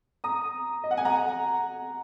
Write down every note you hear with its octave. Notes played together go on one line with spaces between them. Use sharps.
A#5 D#6
D#5
F#5
G#5
F#5 A#5